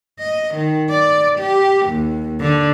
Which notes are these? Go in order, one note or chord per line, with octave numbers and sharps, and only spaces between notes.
D#5
D#3
D5
G4
D#2
D3